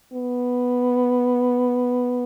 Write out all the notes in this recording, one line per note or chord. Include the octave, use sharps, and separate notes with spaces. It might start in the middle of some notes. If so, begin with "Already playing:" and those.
B3